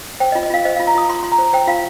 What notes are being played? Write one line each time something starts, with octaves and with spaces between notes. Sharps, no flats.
C5 G5
D#5
F4
D#5
F4 F5
C5 D#5
F4 F5
A#5
F4 D#6
F4 C6
F4 C6
A#5
C5
C5 G5
F4 F5